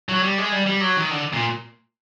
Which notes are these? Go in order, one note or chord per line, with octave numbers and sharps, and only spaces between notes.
F#3
G3
G#3
G3
G3
F#3
D#3
D3
A#2